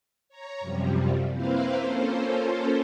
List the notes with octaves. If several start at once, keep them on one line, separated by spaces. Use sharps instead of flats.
C#5 A#5
F#2 C3 F3 G3
A#3 C4 E4 B4 C5 F5
A#3 C#4 F4 A4 C5